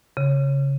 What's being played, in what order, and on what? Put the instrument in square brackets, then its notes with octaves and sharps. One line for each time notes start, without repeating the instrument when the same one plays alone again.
[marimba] C#3